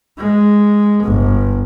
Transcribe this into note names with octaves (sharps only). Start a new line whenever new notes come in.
G#3
G1